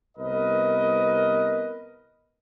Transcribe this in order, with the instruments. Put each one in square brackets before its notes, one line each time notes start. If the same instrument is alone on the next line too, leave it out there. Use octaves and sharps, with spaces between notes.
[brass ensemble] C2 B3 A#4 B4 D#5